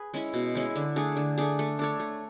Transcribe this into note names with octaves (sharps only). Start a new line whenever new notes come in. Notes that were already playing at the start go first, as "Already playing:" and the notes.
Already playing: G#4 B4
G#3 C#4 E4
B2
G#3 C#4 E4
D3
A3 D4 G#4
D3
A3 D4 G#4
A3
D4 A4 C#5
A3